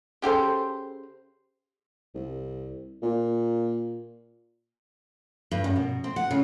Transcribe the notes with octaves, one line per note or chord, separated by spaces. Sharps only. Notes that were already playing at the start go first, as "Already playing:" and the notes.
C#3 G4 A4 C5
C2
A#2
G2
F#2
B2
C4
F#5
C#3